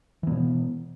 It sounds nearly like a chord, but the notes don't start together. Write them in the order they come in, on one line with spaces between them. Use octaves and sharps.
E3 B3 B2